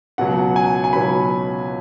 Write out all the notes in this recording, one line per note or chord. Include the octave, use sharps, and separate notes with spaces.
C#2 B2 F#3 C#4 F#5
G#5
G#5
C#2 B2 F#3 C#4 B5